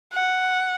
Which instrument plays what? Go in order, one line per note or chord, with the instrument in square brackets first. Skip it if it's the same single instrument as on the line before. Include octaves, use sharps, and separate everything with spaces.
[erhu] F#5